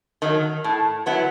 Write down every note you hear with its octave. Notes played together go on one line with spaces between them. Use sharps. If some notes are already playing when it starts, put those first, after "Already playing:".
D#3 F#3
A2
F#3 B3 E4